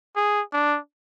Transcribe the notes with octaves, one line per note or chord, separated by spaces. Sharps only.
G#4
D4